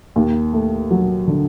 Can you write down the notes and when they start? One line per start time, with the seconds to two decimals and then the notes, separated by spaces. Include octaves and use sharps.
0.16 D#2
0.53 A3
0.91 F#3
1.27 D3